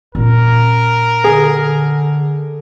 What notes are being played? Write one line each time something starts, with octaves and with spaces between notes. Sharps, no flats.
A#2 C#4 A#4
D3 G#4